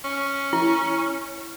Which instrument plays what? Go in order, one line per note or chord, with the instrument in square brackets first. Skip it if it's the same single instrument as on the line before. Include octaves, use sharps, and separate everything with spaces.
[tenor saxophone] C#4
[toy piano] E4